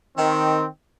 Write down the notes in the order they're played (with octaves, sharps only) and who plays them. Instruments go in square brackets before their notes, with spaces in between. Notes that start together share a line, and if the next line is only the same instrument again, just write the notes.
[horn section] D#3 [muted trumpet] C4